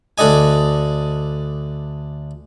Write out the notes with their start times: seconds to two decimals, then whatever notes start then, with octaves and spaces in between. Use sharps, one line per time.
0.18 D2 D4 A4 D#5 G#5